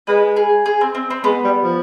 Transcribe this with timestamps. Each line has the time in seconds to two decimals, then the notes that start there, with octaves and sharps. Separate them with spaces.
0.07 G#3 B4
0.37 G#4
0.66 G#4
0.81 C4
0.95 C4
1.10 C4
1.24 G#3 B3
1.44 G3
1.64 F3